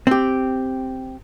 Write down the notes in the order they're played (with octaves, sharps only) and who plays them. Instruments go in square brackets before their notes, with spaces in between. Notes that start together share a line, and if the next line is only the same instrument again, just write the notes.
[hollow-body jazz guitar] C4 G4